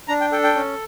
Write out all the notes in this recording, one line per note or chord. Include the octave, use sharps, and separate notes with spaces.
D4 A#5
G5
A4 G5
G5
C#4